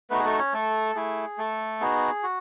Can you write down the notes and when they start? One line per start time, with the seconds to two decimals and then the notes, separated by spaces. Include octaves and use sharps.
0.10 A3 B3 D#4 F#4 B4
0.19 G#4
0.24 A3 A4
0.39 C#4 C#5
0.53 A3 A4
0.95 A3 E4 G#4
1.38 A3 A4
1.81 B3 D#4 F#4 G#4
2.23 F#4